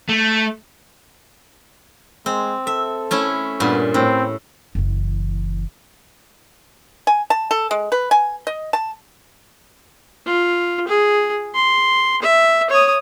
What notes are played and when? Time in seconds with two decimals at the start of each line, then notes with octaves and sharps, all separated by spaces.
0.09 A3
2.26 G#3 C4
2.67 A4 E5
3.11 A3 C#4 E4
3.60 G2 A#2 B3
3.94 A2 C4
4.75 F#1 E3
7.07 G#5
7.30 A5
7.51 A4
7.71 G#3
7.92 B4
8.11 G#5
8.47 D#5
8.73 A5
10.26 F4
10.88 G#4
11.55 C6
12.22 E5
12.70 C#5 D#6